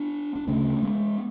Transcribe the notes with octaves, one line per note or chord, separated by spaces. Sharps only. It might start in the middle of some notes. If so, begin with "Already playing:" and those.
Already playing: B3 D4
D4
D2 C#3 A3 C#4
G#3 B3